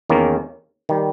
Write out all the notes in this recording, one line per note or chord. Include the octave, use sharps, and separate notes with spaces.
E2 D#3 A#3 C#4
D#3 G3